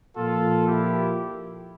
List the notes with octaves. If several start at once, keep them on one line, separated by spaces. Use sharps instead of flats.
A#2 F3 A#3 F4 A4
E4 G4